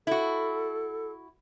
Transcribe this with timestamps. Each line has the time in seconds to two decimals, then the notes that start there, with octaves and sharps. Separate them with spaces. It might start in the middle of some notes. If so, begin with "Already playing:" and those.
0.07 E4 F#4 A4